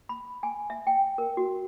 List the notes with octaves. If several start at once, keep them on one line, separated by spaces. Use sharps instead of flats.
B5
G#5
E5
G5
A#4
F#4